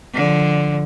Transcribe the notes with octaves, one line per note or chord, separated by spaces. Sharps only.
D3 F3